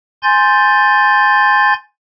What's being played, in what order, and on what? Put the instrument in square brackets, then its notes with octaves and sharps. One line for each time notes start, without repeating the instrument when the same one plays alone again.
[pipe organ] G#5 C6 G6 A6